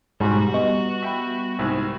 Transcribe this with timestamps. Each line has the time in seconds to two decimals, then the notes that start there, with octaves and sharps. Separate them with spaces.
0.20 G#2 B2 G3 F#4
0.54 G3 B3 D#5 C#6
1.02 E5 G5 B5
1.59 C2 G#2